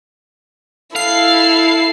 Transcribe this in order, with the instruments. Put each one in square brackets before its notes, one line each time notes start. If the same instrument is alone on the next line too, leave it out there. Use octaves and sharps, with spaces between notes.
[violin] E4 A4 [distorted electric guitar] F5 [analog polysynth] C7